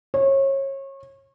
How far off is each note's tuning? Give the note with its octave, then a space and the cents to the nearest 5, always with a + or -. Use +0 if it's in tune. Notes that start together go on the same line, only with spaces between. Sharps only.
C#5 -30